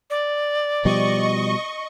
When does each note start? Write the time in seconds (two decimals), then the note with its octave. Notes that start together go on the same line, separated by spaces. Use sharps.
0.10 D5
0.85 B2 F3 G3 D#5 C#6